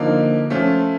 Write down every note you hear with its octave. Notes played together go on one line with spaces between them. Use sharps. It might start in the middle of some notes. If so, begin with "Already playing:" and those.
Already playing: D3 F3 A#3 D#4
F3 A3 C#4 F4